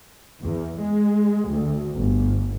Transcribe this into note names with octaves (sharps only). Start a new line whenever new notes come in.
E2
G#3
D2
G1